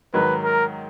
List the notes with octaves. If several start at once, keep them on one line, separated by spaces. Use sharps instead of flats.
G#2 D#3 F#3 B4
A#4